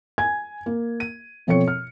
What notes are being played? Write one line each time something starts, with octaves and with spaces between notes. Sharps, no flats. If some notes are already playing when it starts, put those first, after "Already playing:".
G#5 G#6
A#3
D#7
B2 F3 C4 A4 C#5 C#7
F6